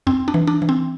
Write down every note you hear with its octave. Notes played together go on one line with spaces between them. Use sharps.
F2 C4
D4
E3
D4
E3
C4